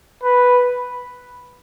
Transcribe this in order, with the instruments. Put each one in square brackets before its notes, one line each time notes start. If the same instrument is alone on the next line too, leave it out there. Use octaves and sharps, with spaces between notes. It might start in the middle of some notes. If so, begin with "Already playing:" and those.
[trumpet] B4